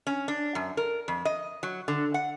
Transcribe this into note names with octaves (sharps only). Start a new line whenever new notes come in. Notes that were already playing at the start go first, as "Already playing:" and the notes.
C#4
D4
F#2
A#4
F2
D#5
F#3
D3
F#5